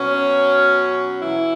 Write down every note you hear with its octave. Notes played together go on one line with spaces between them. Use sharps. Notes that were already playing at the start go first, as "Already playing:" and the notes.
Already playing: B2 F#3 C#4
E3 E4